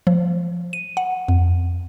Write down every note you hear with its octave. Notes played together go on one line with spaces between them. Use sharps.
F3
D#7
F#5
F2